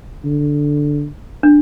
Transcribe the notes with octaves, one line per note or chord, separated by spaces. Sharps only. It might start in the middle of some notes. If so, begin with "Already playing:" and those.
D3
D4